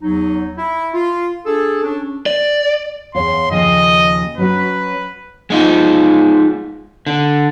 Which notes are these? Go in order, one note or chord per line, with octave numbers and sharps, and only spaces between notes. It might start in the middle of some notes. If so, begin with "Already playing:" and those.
E2 F#3 D#4
E4
F4
D4 G#4 A4
C#4 D4
D5
E2 C#5 F5 C6
D#2 C#3 F3 D#5
F#3 C#4 F#4 B4
G#3 D#4 F4
D3